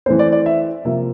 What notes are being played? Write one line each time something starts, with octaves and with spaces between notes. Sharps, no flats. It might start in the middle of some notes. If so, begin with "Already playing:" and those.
E3 A3 C4 C5
D5
D5
E5
C3 F3 A#3 E5